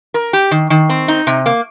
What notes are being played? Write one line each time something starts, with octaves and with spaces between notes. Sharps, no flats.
A#4
G4
D#3
D#3
C4
D#4
C3
A#3